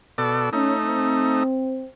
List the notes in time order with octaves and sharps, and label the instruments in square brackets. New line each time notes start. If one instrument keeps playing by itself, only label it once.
[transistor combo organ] B2 A4 D5
[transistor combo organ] A3 D#4 [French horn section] C#4
[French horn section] C4